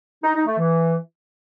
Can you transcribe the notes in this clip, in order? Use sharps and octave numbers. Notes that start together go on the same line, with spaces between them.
D#4
D#4
A3
E3